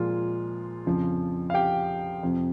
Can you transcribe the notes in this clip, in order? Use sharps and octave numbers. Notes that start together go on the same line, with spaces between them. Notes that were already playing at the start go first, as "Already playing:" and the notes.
Already playing: A#2 F3 G#3 F4
F2 C#3 F3
F5
G4 G5
F2 C3 F3